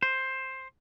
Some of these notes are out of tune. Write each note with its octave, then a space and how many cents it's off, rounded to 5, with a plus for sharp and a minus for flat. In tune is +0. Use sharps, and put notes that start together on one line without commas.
C5 +10